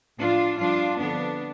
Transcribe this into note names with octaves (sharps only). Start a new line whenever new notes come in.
A2 F3 D4 F4
G2 F3 D4 F4
F2 D3 F3 B3 D4